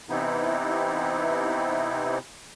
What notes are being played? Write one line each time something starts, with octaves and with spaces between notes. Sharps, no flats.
C3 E3 B3 C4 D#4 E4